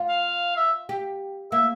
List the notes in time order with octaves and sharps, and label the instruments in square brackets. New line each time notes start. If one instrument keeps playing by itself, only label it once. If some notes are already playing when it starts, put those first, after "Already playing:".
Already playing: [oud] F4
[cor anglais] F5
E5
[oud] G4
[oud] A#3 [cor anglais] E5